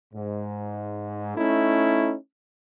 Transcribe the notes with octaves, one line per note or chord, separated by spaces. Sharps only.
G#2
A3 C#4 D#4 E4